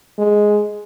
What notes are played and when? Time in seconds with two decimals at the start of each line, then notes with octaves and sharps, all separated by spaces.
0.18 G#3